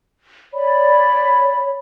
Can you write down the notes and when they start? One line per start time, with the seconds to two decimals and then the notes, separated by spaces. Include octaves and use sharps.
0.53 C#5 D5 B5